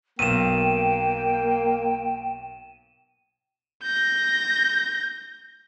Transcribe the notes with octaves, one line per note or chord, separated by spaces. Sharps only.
B1 A#3 G5 D#7 E7
G6 A#6